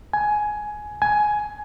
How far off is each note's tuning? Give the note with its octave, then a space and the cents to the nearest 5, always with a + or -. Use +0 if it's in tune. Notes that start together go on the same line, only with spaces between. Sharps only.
G#5 +15
G#5 +15